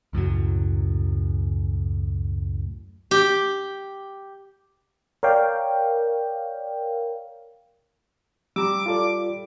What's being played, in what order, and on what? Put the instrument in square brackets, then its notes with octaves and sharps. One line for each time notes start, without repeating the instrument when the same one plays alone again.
[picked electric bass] C#2 F#2 A2 F#3
[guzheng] G4
[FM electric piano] A#4 C#5 D5 F5 G5
[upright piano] G3 [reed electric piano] A#5 E6 [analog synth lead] D6
[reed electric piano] F4 A4 D5